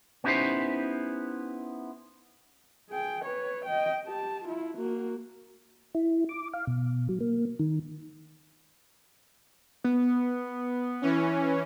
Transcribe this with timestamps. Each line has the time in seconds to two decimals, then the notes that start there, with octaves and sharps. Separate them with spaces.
0.24 B3 C#4 D#4 E4 G4 C5
2.89 G#4 G5
3.24 B4 C#5
3.65 D#5 G5
4.05 G4 A5
4.44 E4 F4
4.76 A#3 F#4
5.95 E4
6.29 D6
6.54 F5
6.67 B2
7.09 F#3
7.21 A#3
7.60 D#3
9.84 B3
11.02 E3 C#4